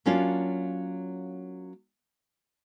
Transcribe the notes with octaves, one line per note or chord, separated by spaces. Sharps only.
F#3 A#3 C#4 D4 F4